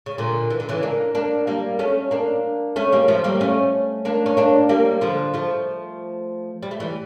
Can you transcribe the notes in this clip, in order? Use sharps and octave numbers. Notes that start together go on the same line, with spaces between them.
C#3
A#2 D3
E3
D3
C#3 E3
A#3 D4
A#3 D4
G3 A#3
A3 C#4
A#3 D4
A3 C#4
G3 A#3
F3 A3
G3 A#3
A3 C#4
A#3 D4
C#4
A#3 D4
G3 A#3
D3 F3
F3 A3
G3
A3
E3 G3